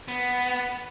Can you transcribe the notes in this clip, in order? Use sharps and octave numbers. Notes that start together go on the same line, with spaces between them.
B3